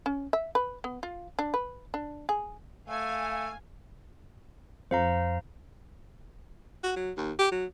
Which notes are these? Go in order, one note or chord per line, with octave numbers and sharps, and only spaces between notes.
C#4
E5
B4
B3
F4
D4
B4
D4
G#4
A3 F5 G#5
F2 C5 F5 A#5
F#4
F#3
D#2
G4
F#3